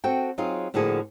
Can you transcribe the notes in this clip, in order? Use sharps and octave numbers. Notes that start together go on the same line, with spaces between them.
C4 F#4 A4 F#5 G5
F#3 C4 D#4 F4 G#4
A2 D3 F3 A#3 F#4 G#4